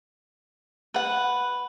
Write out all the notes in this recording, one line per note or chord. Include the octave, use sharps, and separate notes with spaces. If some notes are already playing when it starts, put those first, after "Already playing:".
B4 F#5